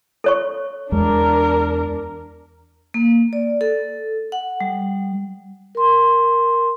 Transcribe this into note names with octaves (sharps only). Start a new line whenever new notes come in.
A4 C#5 C#6
E2 G#3 D4 A#4
A#3
D5
A4
F#5
G3
A#4 C6